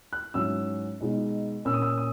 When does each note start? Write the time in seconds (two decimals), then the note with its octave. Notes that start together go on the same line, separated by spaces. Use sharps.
0.13 F#6
0.34 G#2 F#3 C#4 E4 E6
1.01 B2 G#3 D#4
1.65 A#2 A#3 C#4 E6
1.74 D#6
1.82 E6
1.98 D#6